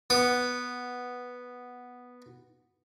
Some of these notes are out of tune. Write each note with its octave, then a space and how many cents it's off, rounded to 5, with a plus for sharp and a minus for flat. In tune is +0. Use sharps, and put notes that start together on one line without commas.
B3 +0 D#6 -40